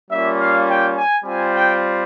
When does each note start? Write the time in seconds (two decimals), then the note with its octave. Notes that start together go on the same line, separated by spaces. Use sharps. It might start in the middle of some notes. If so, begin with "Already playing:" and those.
0.10 G3 A#3 C#4 F4 E5
0.39 F5
0.67 G5
0.95 G#5
1.23 G3 C4 F4 G#5
1.53 G5